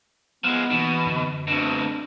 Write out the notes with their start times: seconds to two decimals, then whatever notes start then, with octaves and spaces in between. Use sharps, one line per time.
0.44 F3 G#3 B3 E6 F#6
0.71 B2 E3 A#3 D#4
1.06 F#2 D3
1.48 D2 B2 C4 D4 A#6